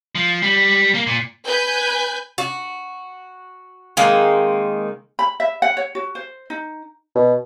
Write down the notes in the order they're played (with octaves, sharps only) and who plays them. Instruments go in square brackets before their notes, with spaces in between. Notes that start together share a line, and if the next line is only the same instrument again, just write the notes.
[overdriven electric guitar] F3
G3
A#3
A#2
[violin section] B4 G#5 G6
[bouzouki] F#4
D#3 G#3 A#3 C4
[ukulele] B5
E5
F#5
C#5
F#4
C5
D#4
[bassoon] B2